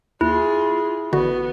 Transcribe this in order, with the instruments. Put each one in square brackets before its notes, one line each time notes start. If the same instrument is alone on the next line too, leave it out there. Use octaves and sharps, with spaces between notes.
[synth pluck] D#2 [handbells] E4 [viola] F4 G#4
[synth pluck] A1 D3 F#4 [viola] B3